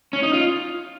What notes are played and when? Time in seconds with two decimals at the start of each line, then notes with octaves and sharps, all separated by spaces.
0.13 C#4
0.23 D#4
0.34 F4